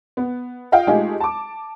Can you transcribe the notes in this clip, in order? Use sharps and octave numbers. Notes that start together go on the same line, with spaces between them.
B3
F4 D#5 F5 G5
G#3 A3 D#4 F4 G4 G#4
A5 D6